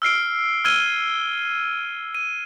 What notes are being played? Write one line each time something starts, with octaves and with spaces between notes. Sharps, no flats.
E6 F6 C7 D7
E6 F6 G#6 D#7 G7
D#7